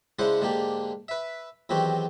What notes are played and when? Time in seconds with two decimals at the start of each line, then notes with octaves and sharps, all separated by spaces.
0.19 C#3 G#3 D4 E4 C5 F#5
0.41 G#2 D3 A#3 D4 G4
1.08 B4 E5
1.69 E2 D#3 F#3 C4 F#4 G4